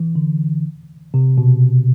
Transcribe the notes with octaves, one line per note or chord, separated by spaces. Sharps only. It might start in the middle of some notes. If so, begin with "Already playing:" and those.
Already playing: E3
D3
C3
B2